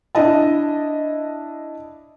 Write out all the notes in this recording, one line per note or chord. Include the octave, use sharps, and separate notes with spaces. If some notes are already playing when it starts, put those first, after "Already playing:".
D4 E4 D#5 A5